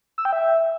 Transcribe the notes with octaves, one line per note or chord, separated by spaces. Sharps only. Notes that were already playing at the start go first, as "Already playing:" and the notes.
E6
G5
E5